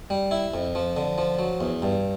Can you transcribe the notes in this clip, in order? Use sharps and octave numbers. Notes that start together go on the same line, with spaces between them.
G3
E4
F2
F3
D3
F3
F#3
E2
G2